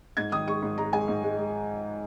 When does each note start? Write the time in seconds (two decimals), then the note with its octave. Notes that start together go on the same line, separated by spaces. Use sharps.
0.17 G#2 G#6
0.32 D#3 D#6
0.47 G#3 C#6
0.62 G#2
0.78 G#3 A#5
0.93 G#3 G#5
1.08 G#2
1.23 G#3
1.38 G#3